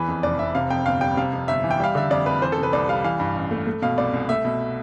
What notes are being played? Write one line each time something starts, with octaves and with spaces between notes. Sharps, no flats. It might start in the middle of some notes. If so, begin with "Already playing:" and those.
Already playing: E2 E3 B4
F2
F1 D5
F1 E5
C3 F5
F2 G5
G1 F5
G3 G5
C3 F5
F2
G1 E5
E3
G5
G3 F5
D3 E5
F2 D5
F2 B4
E3 C5
A4
C3
B4
C2 D5
G3 F5
E3 F5
G2
A1
A3
A3
B2 F5
C2 D5
C2
A3 E5
B2